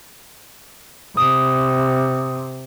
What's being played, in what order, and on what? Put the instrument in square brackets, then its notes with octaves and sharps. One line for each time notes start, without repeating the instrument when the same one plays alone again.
[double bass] C3 [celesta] D#6